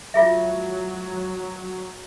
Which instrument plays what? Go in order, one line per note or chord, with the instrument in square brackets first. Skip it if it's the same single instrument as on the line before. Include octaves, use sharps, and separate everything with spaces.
[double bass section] F#3 [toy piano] F4 G#4 E5